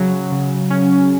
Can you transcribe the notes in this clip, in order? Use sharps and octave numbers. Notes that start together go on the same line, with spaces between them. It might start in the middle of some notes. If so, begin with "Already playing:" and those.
Already playing: C#3 F#3
C#3
C#4